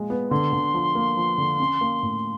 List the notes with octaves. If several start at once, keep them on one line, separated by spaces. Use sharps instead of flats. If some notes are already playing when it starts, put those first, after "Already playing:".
Already playing: A#2 F3 G#3
B3
D3 C6
D3
F3
A#3
F3
D3
C#4
A#3
A2